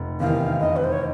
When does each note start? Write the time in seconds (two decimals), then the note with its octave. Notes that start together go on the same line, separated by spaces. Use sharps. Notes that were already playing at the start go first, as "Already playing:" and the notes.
Already playing: F1
0.20 E2 C3 D#3 F5
0.60 F1 D#5
0.76 B4
0.84 C5
0.92 C#5